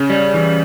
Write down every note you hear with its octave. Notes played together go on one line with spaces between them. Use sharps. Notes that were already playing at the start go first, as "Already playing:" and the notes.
Already playing: C#3 C#4
G3
E3